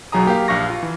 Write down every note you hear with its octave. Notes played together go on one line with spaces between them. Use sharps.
B1 F#3 G#4 A#5 D#6
A#3 G4 A#4 F5
A#1 F5 C#6 A#6
F4
E3